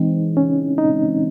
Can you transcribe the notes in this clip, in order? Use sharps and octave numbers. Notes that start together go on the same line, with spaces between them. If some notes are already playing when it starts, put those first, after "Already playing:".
Already playing: E3 G#3 C4 D#4
C#4
D#4